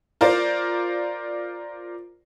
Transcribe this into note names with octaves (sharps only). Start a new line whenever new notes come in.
F4 A#4 C5 D5 F5